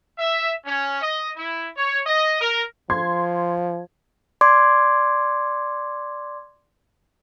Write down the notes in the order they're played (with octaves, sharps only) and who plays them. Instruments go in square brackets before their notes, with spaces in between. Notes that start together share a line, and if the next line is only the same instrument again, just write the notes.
[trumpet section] E5
C#4
D#5
E4
C#5
D#5
A#4
[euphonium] F3 [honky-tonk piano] C6 G#6
[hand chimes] D5 C6 D6 G#6